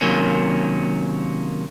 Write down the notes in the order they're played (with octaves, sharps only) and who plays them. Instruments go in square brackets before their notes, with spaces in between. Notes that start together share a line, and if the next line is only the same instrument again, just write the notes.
[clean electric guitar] C3 D#3 F#3 A#3 C#4